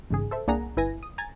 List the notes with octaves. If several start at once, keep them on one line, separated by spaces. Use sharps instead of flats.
A1 G#2 C#3 G#4
A4 C5 E5
C2 A#3 D4 G#4 F#5 A#5
G1 E4 B4 G#5 A#6
D#6
G#5 A#5 G#6 A6